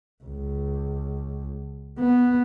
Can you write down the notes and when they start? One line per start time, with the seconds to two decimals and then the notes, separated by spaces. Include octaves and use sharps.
0.24 C#2
1.99 B3